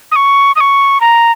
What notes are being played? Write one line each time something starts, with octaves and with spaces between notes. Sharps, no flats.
D#6
C#6
D#6
C#6
A#5